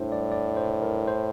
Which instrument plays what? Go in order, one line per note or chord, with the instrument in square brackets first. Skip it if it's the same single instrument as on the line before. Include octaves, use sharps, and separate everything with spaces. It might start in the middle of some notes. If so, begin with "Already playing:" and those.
Already playing: [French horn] A2 [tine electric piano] D4 E4 C5
[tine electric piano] D5
D5
C5
A#4
C5